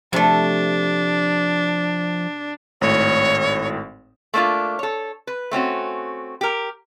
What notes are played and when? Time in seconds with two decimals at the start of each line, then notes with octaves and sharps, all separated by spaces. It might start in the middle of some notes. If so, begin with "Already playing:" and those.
0.13 C3 F3 A3 D4
2.81 G#1 A2 C#5
4.34 A3 A#3 D4 E4 F4
4.79 A4 C#5
5.27 B4
5.51 A3 C4 C#4 F#4
6.41 G4 A#4